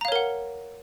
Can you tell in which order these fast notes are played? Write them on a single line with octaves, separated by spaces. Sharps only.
A#5 F5 C#5 A#4 F#5